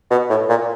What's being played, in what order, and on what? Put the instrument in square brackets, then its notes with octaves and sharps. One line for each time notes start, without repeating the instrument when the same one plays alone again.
[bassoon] B2
A2
A#2